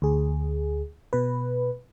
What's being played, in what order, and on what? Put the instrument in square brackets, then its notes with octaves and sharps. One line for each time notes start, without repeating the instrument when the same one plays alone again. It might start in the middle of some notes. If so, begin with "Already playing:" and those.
[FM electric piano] D2 G#4
B2 B4